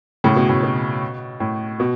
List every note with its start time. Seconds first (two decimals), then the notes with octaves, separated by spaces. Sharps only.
0.24 A2 C#3
0.36 B2
0.49 A2
0.63 B2
1.40 A2
1.80 B2